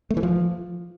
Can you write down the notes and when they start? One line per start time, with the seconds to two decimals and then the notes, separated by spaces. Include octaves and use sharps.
0.10 A3
0.17 E3
0.23 F3